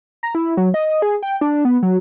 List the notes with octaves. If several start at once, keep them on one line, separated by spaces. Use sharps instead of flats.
A#5
E4
F#3
D#5
G#4
G5
D4
B3
F#3